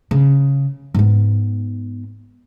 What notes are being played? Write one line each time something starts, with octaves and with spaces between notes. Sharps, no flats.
C#3
G#2 B3